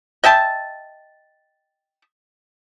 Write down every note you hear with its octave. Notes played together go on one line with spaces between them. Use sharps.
D#5 E5 G5 A5